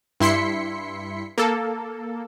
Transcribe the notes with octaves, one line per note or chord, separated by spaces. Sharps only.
G2 E4 C6 B6 C#7
A#3 A4